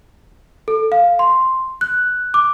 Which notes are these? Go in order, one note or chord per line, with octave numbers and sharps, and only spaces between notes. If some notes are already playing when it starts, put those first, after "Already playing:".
A4
F5
C6
F#6
D6